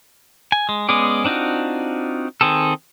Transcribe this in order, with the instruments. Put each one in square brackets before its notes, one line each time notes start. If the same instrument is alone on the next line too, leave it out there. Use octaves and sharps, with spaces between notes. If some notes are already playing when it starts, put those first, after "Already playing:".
[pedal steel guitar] G#5
G#3
G#3 B3 C#4 G#4 D5
C4 D4 D#4 F4 F#4
D#3 C4 G#4 A4